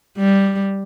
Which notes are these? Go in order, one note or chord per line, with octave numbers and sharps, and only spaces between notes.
G3